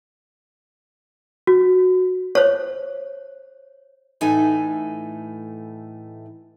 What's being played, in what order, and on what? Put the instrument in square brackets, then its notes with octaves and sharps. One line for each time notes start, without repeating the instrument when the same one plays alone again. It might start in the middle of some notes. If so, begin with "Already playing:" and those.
[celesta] F#4
[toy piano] C5 C#5
[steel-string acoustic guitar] A2 E3 A3 D#4 A4 G#5